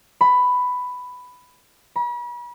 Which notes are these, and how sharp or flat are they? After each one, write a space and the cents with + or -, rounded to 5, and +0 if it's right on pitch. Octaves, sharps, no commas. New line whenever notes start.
B5 +10
B5 -40